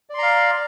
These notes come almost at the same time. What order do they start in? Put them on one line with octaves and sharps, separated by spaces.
D5 C6 A#5 F5